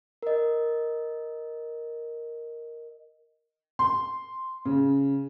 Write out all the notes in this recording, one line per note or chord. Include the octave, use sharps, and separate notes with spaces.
A#4 D#5
C6
C#3